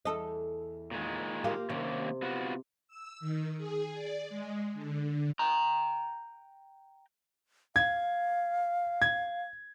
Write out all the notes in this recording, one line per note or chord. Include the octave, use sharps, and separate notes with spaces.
E2 A4 D#5
A#2 D#3 G#3
A#3 F4 G4
C3 D#3 A#3 C#4
B3 F4 F#4
E6
D#3
G#4
D5
G#3
D3
G5 A#5
F5 G#6
G#6